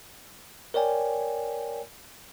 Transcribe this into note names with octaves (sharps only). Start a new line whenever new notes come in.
A#4 C#5 D5 G5 G#5